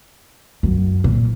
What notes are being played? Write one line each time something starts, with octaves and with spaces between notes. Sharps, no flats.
F#2
A#2